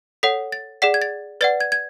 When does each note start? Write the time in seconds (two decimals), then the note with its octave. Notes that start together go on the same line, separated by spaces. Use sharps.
0.23 A4 C#5 F#5 B6
0.52 A6
0.82 G#4 D5 F#5 B6
0.94 G#6
1.02 A6
1.41 B4 D5 F#5 A6
1.61 G#6
1.72 G#6